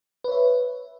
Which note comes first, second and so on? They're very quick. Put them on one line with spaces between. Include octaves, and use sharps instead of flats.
B4 C#5 E5